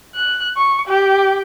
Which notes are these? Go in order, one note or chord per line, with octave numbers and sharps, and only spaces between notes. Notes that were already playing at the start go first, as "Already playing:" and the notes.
F#6
C#6
G4